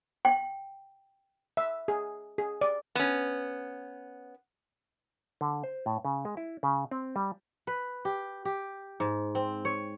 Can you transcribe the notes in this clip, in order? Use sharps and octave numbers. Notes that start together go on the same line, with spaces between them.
G5
E5
G#4
G#4
D5
B3 C#4
D3
C5
A2
C#3
G#3
E4
C#3
C4
G3
B4
G4
G4
G#2
C4
C#5